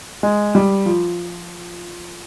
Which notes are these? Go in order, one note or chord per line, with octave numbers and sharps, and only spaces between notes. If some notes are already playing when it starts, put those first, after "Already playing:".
G#3
G3
F3